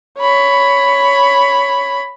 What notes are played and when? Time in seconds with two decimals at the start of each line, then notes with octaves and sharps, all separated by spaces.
0.19 C#5 B5